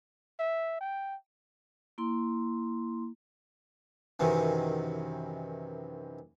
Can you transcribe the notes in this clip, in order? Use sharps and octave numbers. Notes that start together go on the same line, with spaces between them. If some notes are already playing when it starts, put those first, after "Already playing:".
E5
G5
A#3 E4 C6
F#2 C3 D#3 E3